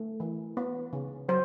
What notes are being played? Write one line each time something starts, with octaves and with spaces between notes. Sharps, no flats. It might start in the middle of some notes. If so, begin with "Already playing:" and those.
Already playing: A3
E3
B3
C#3
F#3 C5